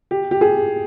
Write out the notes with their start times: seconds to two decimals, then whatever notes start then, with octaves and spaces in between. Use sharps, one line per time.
0.11 G4
0.31 G4
0.41 G#4